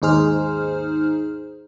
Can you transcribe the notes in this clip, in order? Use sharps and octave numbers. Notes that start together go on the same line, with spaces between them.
D#2 G#2 D#4 G#4 C5 F6